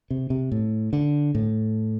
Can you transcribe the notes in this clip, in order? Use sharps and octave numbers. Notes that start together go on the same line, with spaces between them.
C3
C3
A2
D3
A2